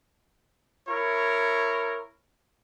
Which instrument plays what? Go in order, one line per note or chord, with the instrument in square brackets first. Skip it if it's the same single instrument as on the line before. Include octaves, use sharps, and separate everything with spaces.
[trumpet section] E4 A#4 C#5